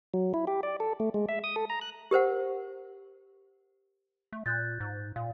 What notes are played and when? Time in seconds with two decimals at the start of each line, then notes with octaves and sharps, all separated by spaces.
0.14 F#3
0.34 E4
0.47 G4
0.63 D5
0.80 A4
1.00 A3
1.14 G#3
1.29 E5
1.44 D#6
1.56 A4
1.70 A#5
1.81 F#6
2.11 G4 A#4 C5 F#5
4.33 A3
4.46 A#2 F#6 G6 A6
4.80 G#2
5.16 A#2 F5